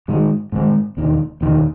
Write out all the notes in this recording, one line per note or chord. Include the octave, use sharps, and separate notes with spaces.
G#2 D#3 G#3
G#2 D#3 G#3
E1 D#2 D#3
E1 D#2 D#3